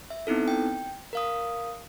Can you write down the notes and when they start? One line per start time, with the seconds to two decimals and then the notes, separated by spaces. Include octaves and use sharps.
0.10 E5
0.27 B3 C4 D#4 E4 A4
0.48 G5
1.13 A#4 F5 D#6